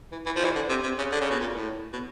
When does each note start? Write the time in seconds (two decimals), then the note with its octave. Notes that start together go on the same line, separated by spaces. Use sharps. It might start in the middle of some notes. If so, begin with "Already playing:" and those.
0.12 E3
0.26 E3
0.36 F3
0.45 E3
0.55 D3
0.69 C3
0.83 C3
0.98 C#3
1.12 D3
1.21 C#3
1.31 B2
1.40 A#2
1.55 A2
1.93 B2